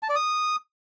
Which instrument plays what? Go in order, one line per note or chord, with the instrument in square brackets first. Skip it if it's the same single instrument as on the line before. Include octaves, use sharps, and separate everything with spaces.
[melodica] A5
D5
D#6